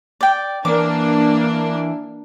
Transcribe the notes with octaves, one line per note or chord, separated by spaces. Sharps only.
D5 G5
E3 A#3 D4 D6